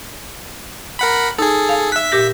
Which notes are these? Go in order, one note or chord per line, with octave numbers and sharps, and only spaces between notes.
A#4 F#5 B5
D#4 G#4 A4
F5
E5 F#6 B6
A#2 G4 A#6